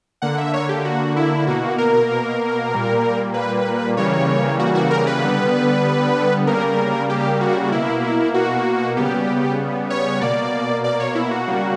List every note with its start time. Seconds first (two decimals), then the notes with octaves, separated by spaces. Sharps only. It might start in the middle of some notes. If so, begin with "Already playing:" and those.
0.22 D3 A#3 F#5
0.38 E5
0.54 C#5
0.69 G4
0.85 F#4
1.16 E4
1.47 B2 A#3 F#4
1.78 A#4
2.72 A#2 G3 A#3
3.34 B4
3.97 C#3 E3 G3 A#3 C#5
4.59 F#4
4.75 F#4
4.91 A#4
5.07 B4
5.22 D3 G3 B3
6.47 C#3 G3 A#3 A#4
7.10 G4
7.41 F#4
7.71 B2 A#3 E4
8.34 F#4
8.97 C#3 G3 B3 G4
9.90 C#5
10.21 B2 A#3 D5
10.84 D5
11.00 C#5
11.15 E4
11.31 F#4
11.47 C#3 G3 A#3